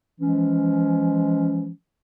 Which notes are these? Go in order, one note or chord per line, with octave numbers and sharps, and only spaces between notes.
E3 F3 G#3 C#4